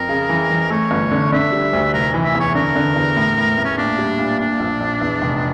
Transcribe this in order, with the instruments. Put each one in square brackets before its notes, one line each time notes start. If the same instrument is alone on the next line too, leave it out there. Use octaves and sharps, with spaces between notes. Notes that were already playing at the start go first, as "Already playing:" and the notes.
Already playing: [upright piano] F2 [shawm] A#4
[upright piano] C#3
E3
E3
[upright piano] A3 [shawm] C#5
[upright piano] G1
D3
[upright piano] D3 [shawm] E5
[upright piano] G3
D2
[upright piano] F1 [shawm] A#4
[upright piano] E3
[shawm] E5
[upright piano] E2
[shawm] C#5
[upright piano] D3 [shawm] A#4
[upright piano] D3
E2
A2
A2
A2
[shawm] C#4
[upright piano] A#2 [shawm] D4
[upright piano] G3
A#2
[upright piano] A#2 [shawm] D4
[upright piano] A#1
A#1
E2
F1